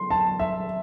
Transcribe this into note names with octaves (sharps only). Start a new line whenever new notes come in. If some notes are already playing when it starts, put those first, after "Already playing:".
Already playing: C6
A5
E5